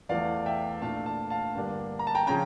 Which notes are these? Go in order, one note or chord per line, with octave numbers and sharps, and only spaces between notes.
E2 E3 A3 D5 F5
E5 G5
A#2 A3 D4 F5 A5
F5 A5
F5 A5
G2 D3 G3 A#3 D4
A#5
A5
G5 A#5
C#3 F3 C#4 G5 A#5